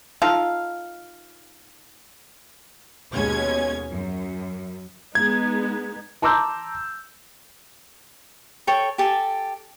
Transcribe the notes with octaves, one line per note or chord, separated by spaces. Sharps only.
D#4 F4 A4 F5
D#2 B2 G#3 C#4 G#6
F#2
G#3 B3 D#4 G#6
A5 A#5 C6 D6 E6 G6
A4 C#5 G5
G4 A4 G#5 A5